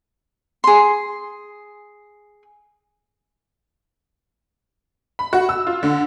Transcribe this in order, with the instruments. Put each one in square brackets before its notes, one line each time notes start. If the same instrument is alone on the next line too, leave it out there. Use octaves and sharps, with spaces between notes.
[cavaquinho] G#4 C6
[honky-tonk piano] B5
F#4
E6
F4
D3